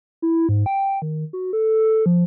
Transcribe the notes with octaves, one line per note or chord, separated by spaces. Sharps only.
E4
G#2
G5
D#3
F#4
A4
F3